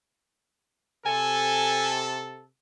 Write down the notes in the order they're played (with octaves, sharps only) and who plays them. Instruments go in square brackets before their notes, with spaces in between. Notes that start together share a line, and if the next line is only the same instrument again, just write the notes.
[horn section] C3 A4 [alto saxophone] G#5